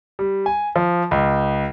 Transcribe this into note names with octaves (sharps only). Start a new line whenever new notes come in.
G3
G#5
F3
C#2